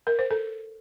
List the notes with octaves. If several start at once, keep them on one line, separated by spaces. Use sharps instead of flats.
A#4
C5
A4